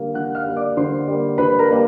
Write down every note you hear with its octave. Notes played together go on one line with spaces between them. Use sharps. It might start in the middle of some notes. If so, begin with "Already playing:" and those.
Already playing: D3 G3 A#3 F5
D3 F#5 F#6
F5 F6
G3 A#3
D5 D6
D3 C5 C6
G3 A#3
D3 B4 B5
A#4 A#5
G3 A#3